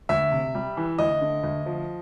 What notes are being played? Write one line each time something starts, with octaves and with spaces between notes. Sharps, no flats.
D2 E5
C3
G3
E3
D2 D#5
D3
D2
F3